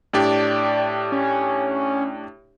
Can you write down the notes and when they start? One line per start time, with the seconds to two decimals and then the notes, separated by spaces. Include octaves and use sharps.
0.13 A2 D4 G4 D5
1.12 C#4